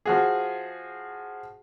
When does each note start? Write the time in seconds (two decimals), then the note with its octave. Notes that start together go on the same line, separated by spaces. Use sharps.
0.06 F3 F#4 G#4